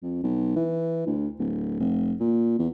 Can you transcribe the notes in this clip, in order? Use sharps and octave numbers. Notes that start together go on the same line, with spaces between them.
F2
B1
E3
D2
D1
F1
A#2
E2